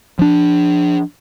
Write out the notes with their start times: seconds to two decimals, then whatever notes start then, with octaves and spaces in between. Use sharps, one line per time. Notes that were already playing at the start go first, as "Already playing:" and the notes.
0.19 F3 D4